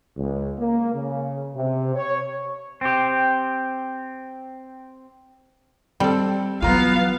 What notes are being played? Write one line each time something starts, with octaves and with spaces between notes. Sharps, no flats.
C#2
A#3
C#3
C3
C#5
C4 G4
G3 C4 A4
E3 F#3 B3 F4 F5 A#5